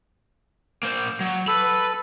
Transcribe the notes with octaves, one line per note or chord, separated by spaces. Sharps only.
A#3 C5
F#3
A4 B4 B5